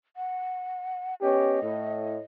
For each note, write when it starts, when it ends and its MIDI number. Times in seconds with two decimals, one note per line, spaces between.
0.17 1.14 78
1.22 1.58 59
1.22 1.58 61
1.22 1.58 67
1.22 2.19 75
1.61 2.18 45